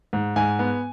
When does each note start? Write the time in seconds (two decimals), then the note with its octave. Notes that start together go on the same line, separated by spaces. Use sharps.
0.13 G#2
0.36 G#2 G#5
0.59 B3